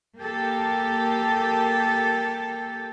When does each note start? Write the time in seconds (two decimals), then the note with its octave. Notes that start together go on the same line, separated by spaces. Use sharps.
0.18 A#3 G4 A4